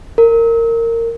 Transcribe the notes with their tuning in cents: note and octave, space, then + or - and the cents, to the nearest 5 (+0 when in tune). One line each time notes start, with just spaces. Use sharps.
A#4 -20